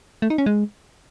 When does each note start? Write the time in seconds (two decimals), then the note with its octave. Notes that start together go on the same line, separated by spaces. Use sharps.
0.22 A3
0.30 D#4
0.38 C#4
0.46 G#3